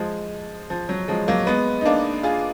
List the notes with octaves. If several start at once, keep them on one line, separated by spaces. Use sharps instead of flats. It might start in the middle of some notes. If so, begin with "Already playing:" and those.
Already playing: F3 G#3
F3
F#3
F3 G#3
F#3 A#3
G#3 B3
D#4
A#3 D4
F4 G#4